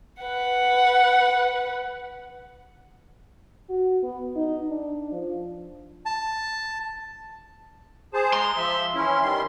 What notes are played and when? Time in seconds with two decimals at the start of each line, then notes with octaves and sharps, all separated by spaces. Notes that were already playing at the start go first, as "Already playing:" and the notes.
0.23 B4 F#5
3.69 F#4
4.03 B3
4.35 D#4
4.70 D4
5.12 F3
6.05 A5
8.14 G#4 C5 A5
8.33 G#3 A#5 C6
8.57 F3 E5
8.95 E3 C#4 E4
9.21 D#3 G3 C6